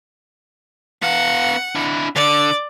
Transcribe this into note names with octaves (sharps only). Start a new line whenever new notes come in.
B3 F5 F#5
D4 E4
D3 D5